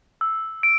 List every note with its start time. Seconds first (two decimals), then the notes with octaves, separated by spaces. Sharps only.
0.21 E6
0.63 D7